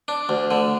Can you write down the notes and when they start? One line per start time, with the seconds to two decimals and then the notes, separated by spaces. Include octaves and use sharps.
0.08 D4
0.29 D2
0.51 D3